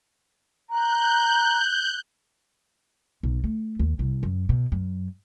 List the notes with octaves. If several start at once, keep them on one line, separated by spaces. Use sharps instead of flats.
A#5 F#6 G6
B1
A3
D#2
C2
F#2
B2
F#2